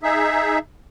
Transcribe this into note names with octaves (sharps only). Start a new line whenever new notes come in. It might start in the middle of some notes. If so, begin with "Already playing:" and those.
D#4 G#4 E5